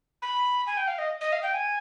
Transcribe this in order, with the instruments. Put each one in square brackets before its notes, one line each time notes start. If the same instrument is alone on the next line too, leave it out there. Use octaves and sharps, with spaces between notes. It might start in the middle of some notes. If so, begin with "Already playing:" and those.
[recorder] B5
G#5
G5
F5
D#5
D#5
F5
G5
G#5